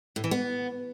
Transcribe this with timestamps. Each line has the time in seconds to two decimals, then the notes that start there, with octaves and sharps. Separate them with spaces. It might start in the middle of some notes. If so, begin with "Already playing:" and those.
0.16 A2
0.24 E3
0.31 B3